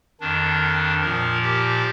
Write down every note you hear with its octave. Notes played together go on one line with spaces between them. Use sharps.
F2 D#3 D4
A#2 F3 A#4
G4